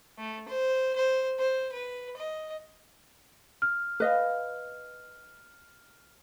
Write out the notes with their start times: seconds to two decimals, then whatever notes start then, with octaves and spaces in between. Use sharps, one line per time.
0.19 A3
0.48 C5
0.96 C5
1.39 C5
1.72 B4
2.17 D#5
3.62 F6
4.00 B4 D#5 F5